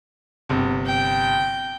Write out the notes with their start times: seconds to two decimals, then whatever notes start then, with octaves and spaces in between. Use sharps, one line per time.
0.49 G1 C3
0.87 G5